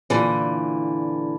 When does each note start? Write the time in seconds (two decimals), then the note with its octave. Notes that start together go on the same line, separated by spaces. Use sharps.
0.10 A#2 D3 E3